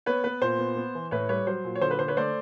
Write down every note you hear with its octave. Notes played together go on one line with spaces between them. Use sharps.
B3 B4 C#5
B3 B4
A#2 C5
B3
B3
E3
A2 B4 C#5
G3 B4 C#5
F#3 C5
A#2
C#5
D3 C5
B4
D3 C5
B4 C#5
A3 C5 D5